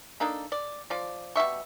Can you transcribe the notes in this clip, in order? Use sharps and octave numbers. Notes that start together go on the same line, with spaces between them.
A#3 D4 D#4 A4
D5
F3 D5
B2 G3 E5 C#6